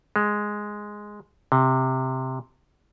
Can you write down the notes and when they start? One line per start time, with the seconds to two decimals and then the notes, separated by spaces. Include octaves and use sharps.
0.16 G#3
1.52 C3